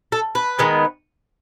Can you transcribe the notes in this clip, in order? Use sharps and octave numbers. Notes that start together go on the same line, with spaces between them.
A4
B4
D#3 G#3 B3